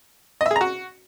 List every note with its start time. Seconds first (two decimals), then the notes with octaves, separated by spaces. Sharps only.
0.41 D#5
0.46 E5
0.51 G#4
0.56 A#5
0.61 F#4